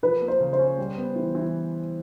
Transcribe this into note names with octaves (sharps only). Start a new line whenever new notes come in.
F3 B4
A#3
C5
C#3
C5
C#4
G3
B3
E3
E3